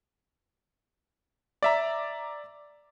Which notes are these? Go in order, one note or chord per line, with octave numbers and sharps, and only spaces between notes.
D5 E5 A#5